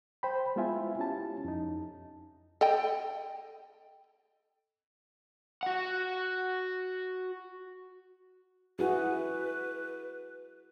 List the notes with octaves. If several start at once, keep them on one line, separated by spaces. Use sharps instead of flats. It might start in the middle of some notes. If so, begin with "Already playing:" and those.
C5 G5 B5
G#3 B3 E4 F4 E5 G#5
C#4 E4 G4 A5
F2 D#4
A4 D#5 G5
F#4 F#5
E4 F#4 G#4 B4